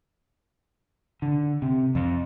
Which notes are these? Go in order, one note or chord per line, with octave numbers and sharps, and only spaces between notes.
D3
C3
F2